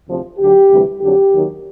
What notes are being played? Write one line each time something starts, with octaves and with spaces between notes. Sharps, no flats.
D2 C3 F3
D2 D3 F#3 G4
D2 C3 E3 G3
F2 D3 F#3 G4
D#2 D#3 F#3